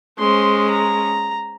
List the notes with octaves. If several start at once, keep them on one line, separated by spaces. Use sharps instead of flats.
G#3 C#4 C5 C6
A#5